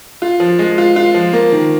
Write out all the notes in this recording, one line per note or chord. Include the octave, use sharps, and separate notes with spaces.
F4
F3
G#3
F4
F4
F3
A#3
D#3